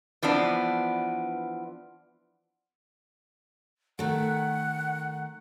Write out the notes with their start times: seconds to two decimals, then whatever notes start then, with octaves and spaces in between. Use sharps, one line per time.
0.23 E3 F3 B3 D4
3.99 D#3 A3 F#5